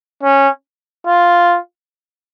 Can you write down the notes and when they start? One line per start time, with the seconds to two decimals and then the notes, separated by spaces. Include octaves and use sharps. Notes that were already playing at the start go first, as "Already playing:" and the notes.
0.23 C#4
1.07 F4